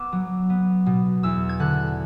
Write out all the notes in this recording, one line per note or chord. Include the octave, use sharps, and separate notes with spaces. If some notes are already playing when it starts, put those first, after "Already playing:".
Already playing: B3 D6 E6
F#3
B3
B2
E2 E6
G#6
D3 F#6